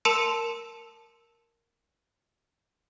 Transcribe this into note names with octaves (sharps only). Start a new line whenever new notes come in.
A#4 A5 C6 E6 C#7 E7